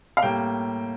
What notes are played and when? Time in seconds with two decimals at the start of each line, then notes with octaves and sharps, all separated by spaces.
0.17 F5
0.23 A2 G3 A#3 G5